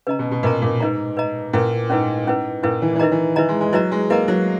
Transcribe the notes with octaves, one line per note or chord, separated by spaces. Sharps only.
C#3 B4 D#5 A#5
B2
B2
A#2 B4 D#5 A#5
A#2
G#2 B4 D#5 A#5
B4 D#5 A#5
A#2 C#4 E4 B4
G#2 C#4 E4 B4
C#4 E4 B4
A#2 C#4 E4 B4
E3
E3
D#3 E4 B4 D#5 A#5
E3
E3 E4 B4 D#5 A#5
G#3
G#3
F#3 E4 B4 D#5 A#5
G#3
A#3 E4 B4 D#5 A#5
F#3